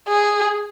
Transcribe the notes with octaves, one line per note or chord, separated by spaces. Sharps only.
G#4